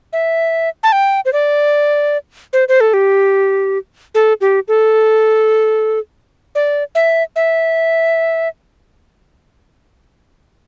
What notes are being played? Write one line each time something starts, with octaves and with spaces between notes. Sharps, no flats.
E5
A5
G5
C5
D5
C5
C5
A4
G4
A4
G4
A4
D5
E5
E5